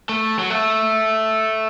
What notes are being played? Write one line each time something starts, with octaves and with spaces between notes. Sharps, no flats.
A3
F#3
A3